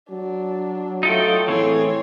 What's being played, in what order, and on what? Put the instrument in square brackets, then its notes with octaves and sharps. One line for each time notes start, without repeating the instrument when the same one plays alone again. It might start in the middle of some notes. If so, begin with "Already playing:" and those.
[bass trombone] F#3 [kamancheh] D4
[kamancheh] A3 F4 [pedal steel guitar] D#4 A4 G5
[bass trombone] A2 [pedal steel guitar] E3 C4 G#4 [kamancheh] C#5